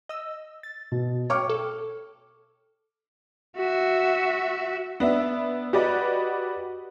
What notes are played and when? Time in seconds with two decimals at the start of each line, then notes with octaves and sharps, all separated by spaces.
0.09 D#5 E6
0.63 A6
0.92 B2
1.30 C#5 G5 C#6 D6 F6
1.49 A4
3.56 F#4 E5
5.00 B3 D4 E5
5.73 F#4 G4 B4 D5 D#5